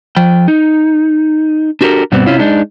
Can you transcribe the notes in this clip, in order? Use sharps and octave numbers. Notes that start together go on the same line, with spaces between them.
F3 G5
D#4
D4 F#4 G4 A4 A#4
G2 B2 G3 B3 C4
C3 C#4 E4 F4
G#3 D4 D#4